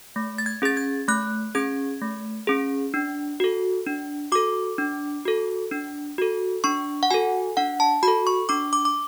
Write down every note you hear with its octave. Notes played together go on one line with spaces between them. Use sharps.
A3
A6
G#6
C#4 G#4 A6
G#6
A3 F#6
C#4 G#4 G#6
A3
C#4 G#4
D4
F#4 A4
D4
F#4 A4 D6
D4
F#4 A4
D4
F#4 A4
D4 C#6
F#5
F#4 A4 G#5
D4 F#5
A5
F#4 B5
A4
C#6
D4 D6
D6
D6